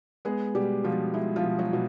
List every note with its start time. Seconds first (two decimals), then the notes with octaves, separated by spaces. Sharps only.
0.25 G#3 B3 G#4
0.55 B2 G3 G4
0.84 B2 F3 F4
1.14 G#3 E4
1.36 F3 F4
1.44 B2
1.59 F#3 F#4
1.73 B2